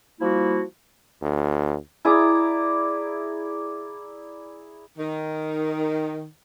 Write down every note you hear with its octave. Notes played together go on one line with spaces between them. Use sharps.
F3 G3 A#3 E4 F#4
D2
E4 G#4 D5 A#5
D#3